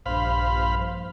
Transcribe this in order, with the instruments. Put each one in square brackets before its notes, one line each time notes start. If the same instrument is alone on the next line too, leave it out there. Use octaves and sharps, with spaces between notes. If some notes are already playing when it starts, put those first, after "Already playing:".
[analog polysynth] A#1 G2 [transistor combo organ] C5 F5 B5